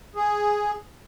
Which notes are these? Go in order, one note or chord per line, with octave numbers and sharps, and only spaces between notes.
G#4